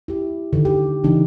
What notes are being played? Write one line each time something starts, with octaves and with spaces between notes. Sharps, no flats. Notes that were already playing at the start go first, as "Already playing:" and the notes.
E4 G4
D3 D#3
G4
C#3 E3 D4 D#4